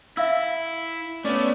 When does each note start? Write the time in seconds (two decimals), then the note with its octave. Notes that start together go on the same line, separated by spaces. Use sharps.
0.17 E4 E5 F5 E6
1.25 A3 B3 C#4 D5